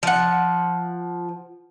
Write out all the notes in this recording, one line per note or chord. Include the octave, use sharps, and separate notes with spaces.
F3 F#5